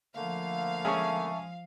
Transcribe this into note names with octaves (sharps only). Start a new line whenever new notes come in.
D3 F3 A3 A#3 F5
G#3 C#4 G#4 E5 A5 C#6